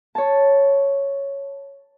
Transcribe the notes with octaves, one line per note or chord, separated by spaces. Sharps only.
C#5 A5